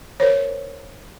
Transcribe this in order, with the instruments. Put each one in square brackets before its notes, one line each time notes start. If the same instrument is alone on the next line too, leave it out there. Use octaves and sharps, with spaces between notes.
[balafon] A#4 C5 C#5